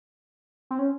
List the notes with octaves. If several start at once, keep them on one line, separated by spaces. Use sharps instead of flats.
C4
C#4